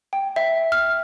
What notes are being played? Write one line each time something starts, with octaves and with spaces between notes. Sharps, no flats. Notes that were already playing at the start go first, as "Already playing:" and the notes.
G5
E5
F6